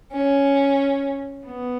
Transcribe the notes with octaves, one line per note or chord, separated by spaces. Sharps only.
C#4
B3